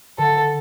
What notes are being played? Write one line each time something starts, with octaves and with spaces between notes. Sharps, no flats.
D3 A4